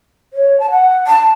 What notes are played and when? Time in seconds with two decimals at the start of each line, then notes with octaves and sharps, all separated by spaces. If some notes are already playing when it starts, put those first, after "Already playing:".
0.33 C#5
0.60 A5
0.71 F#5
1.07 A5